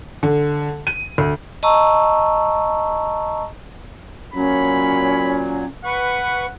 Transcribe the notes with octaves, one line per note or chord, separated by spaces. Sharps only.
D3
D#7
D2
D#5 A5 A#5 C#6 E6
A#2 F#3 C#4 B5
B4 F#5 C#6